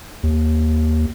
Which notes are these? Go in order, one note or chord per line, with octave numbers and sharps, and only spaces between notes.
D#2